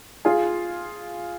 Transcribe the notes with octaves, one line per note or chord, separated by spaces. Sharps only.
F4 G#4